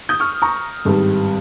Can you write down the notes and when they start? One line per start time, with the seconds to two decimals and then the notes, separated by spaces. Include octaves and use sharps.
0.09 D#6 G6
0.20 C#6 F6
0.42 A#5 C#6
0.85 G#1 G2 G3